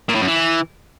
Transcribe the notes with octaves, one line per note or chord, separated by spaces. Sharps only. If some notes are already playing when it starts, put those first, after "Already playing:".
A#2
A2
F#2
E3